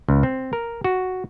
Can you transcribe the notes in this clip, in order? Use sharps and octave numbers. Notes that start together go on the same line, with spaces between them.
C#2
C4
A#4
F#4